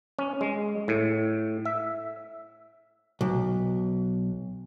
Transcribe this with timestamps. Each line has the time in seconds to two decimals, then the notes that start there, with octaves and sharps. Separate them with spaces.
0.19 C#4
0.41 G#3
0.88 A2
1.65 E5
3.21 B1